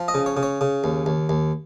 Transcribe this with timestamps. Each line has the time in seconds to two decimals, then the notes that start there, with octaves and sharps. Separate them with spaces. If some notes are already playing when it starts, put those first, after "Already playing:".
Already playing: F3
0.08 D#5
0.14 C#3
0.26 C#5
0.37 C#3
0.43 C#5
0.61 C#3
0.84 D#2
1.06 D#2
1.29 D#2